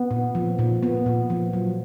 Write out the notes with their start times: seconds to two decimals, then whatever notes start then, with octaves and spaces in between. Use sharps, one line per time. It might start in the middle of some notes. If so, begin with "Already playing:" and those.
Already playing: B3
0.11 A#2
0.35 F3
0.59 A#2
0.83 B3
1.06 A#2
1.30 F3
1.53 F#3